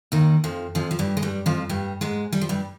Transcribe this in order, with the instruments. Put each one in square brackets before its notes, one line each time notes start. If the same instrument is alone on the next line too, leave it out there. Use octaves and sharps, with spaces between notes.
[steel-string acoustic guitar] D#2 D#3
F2 F3
F2 F3
F3
G2 G3
G#3
G2 G3
F2 F3
G2 G3
G#2 G#3
G3
F3
G2 G3